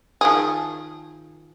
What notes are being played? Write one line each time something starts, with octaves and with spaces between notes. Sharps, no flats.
D#3 F3 G#4